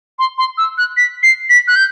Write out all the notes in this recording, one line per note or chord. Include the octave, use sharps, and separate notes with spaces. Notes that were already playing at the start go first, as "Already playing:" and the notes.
C6
C6
E6
F#6
B6
C7
B6
F#6
G6